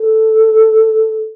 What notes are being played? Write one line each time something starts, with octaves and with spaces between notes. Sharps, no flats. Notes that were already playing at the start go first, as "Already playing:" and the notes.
Already playing: A4